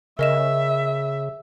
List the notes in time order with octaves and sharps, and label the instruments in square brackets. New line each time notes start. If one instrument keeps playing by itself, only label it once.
[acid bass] C#3 [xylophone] A#4 D#5 E7 [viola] E5